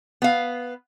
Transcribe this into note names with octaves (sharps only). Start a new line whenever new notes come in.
B3 F5